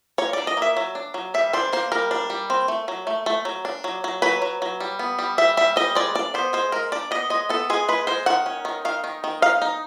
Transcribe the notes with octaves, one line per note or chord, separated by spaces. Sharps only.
A#3 C#5
D4 D5
D#5
A#3 E5
F#3
D4
F#3
G3 E5
D4 C5
A#3 C5
G3 A#4
D4
G3
C4
A3
F#3
A3
A3
F#3
D4
F#3
F#3
F#3 B4
F#3
F#3
G3
B3
G3
G3 E5
G3 E5
G3 D#5
G#3 D5
D4 D5
B3 C5
G#3 C5
G#3 A#4
D4 D5
B3 D#5
G#3 D#5
B3 A4
G#3 G#4
G#3 B4
G#3 C5
D#3 F#5
C#4
D#3
D#3 F5
D#3
D#3
D#4 F5
D#4